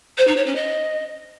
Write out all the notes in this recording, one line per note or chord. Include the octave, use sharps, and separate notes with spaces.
C5
D#4
C#5
C#4
D#5